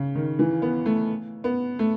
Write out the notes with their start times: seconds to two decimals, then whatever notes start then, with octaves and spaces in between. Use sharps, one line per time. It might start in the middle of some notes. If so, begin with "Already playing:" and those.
Already playing: C#3
0.15 D#3
0.39 E3
0.62 B3
0.86 A3
1.44 B3
1.79 A3